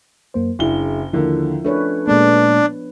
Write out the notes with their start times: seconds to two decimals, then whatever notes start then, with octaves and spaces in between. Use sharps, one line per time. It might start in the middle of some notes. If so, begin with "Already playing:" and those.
0.34 F#2 A#3 C5
0.59 F#1 D4 E4 G#4 G7
1.13 D#2 D3 F3 E4 A#4
1.64 A3 C#4 D4 B4 C#5
2.08 A#2 G#3 A#3 B3 D4